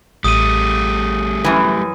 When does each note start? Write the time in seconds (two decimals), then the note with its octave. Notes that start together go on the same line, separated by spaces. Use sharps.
0.24 A1 G3 A3 D#6 D#7
1.45 F#2 E3